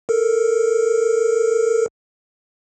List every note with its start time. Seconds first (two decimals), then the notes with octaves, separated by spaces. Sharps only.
0.09 A4 A#4